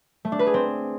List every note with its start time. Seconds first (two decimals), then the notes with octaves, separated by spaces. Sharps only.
0.25 A3
0.32 D4
0.39 B4
0.47 G#4
0.54 C4